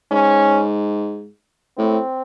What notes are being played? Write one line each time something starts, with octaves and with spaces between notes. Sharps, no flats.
G#2 C#4
A2 C4